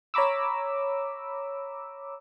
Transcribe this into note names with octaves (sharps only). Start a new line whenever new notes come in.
C#5 A#5 B5 D6 E6